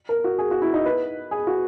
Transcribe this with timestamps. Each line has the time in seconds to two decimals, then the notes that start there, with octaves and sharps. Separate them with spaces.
0.09 A#4
0.24 F#4
0.39 G#4
0.51 F#4
0.62 E4
0.74 D#4
0.86 B4
1.31 G#4
1.47 F#4